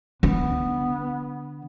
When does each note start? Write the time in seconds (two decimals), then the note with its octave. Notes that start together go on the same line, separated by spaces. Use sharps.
0.23 D3 B3